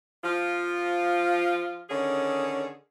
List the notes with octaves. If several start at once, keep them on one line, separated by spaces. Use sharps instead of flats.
F3 F4
D3 D#3 C#4 G#4